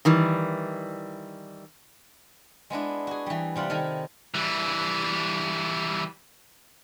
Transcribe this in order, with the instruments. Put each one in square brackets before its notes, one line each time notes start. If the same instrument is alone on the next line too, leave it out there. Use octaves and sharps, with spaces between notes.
[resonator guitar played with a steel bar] D#3 E3 G3
[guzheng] G#3 B3 D4 E4
F#4 G#4
E3 G3
C3 G3 F4 F#5
D#3 E4 A4 F5 G#5
[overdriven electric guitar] E3 G3